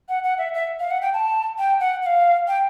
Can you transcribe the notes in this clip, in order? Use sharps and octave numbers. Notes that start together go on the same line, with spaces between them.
F#5
F#5
E5
E5
F5
F#5
G5
A5
G5
F#5
F#5
F5
G5